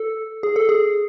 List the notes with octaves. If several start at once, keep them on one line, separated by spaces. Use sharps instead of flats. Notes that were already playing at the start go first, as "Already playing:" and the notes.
Already playing: A4
G#4
A4
G#4